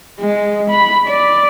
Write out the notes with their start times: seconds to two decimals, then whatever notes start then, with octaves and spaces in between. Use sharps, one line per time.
0.20 G#3
0.71 B5
1.07 D5